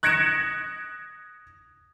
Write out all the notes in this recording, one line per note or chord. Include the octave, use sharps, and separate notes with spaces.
F#6 G#6 A#6 C#7 D7 E7